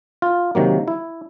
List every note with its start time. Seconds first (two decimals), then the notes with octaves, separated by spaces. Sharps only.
0.22 F4
0.55 C3 D#3 F#3 A#3
0.88 E4